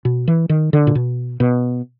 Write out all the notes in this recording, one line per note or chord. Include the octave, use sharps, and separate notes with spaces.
B2
E3
D#3
D3
A#2
B2
B2